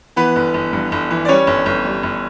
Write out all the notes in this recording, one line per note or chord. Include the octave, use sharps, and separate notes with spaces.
E3 B3 B4
G1
G1
G2
G1
E3
D5
G3 C#4 C#5
G1
G1
G3
G1